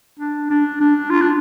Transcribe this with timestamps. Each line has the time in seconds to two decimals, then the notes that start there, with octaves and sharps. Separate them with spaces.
0.19 D4
0.50 D4
0.80 D4
1.10 F4
1.21 D4